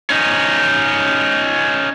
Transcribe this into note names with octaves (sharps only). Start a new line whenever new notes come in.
C#4 D#4